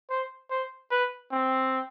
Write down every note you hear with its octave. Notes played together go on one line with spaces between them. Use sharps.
C5
C5
B4
C4